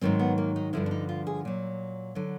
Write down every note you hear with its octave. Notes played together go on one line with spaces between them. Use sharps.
G#2 D#3 F#3 C4
B3
A#3
D#4
G2 D3 F3 E4
D4
D#4
F4
G#4
A#2 F#3
D3 F#3